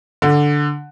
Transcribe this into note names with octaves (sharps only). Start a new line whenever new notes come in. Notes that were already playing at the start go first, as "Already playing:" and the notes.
D3